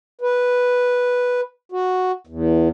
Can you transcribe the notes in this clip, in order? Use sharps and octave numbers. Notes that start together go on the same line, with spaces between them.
B4
F#4
E2